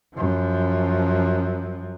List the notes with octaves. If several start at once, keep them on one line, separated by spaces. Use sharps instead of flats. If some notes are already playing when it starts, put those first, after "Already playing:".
F#2 F3